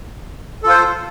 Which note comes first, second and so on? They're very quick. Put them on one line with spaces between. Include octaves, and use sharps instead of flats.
A4 F4 C5